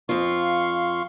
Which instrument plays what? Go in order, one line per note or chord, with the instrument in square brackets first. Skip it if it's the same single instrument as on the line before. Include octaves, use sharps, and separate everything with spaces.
[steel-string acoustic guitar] F2 F4 [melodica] F5 C6 C#6